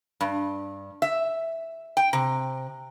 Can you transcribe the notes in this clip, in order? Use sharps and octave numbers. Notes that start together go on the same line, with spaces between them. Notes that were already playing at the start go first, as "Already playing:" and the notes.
G2
E5
G5
C3